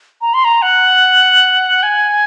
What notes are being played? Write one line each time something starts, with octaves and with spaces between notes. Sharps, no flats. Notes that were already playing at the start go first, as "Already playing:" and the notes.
A#5
C6
A#5
F#5
G#5